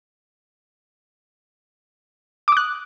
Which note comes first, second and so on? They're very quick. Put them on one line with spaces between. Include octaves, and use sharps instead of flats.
D6 D#6 F#6